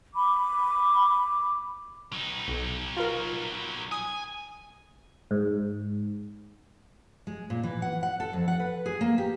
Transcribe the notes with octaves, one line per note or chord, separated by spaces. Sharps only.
B5 D6
F#3 D#4
B1
F4 A#4
G#5 D#6
G#2
G#3
A#2
E3
F#5
F#5
A4
F2
F#5
B4
G#4
A#3
G4